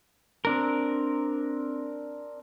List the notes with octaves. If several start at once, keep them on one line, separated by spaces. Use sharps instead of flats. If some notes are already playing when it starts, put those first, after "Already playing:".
C4 D4 A#4